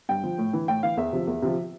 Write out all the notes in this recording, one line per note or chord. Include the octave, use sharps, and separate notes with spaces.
G2 G5
F3
A2
E3
A2 G5
E3 F5
E2 E5
C3 F3
E2
C3 F3